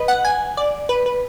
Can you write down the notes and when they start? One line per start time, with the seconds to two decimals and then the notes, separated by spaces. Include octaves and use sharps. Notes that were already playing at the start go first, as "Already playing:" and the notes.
Already playing: B4 D#5
0.08 F#5
0.25 G#5
0.57 D5
0.89 B4
1.06 B4